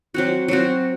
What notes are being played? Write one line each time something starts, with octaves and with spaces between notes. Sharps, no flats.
F#3 C4 F#4
F#3 C4 F#4